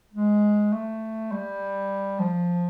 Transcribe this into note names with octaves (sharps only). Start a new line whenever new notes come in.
G#3
A3
G3
F3